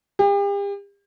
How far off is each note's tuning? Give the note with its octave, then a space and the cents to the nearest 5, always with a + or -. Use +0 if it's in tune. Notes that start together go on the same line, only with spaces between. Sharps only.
G4 +40